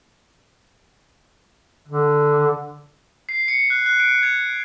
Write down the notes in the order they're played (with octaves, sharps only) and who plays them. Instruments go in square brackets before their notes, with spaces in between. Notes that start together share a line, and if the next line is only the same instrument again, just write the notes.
[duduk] D3
[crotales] C7
C#7
F#6
F#6
D7
G#6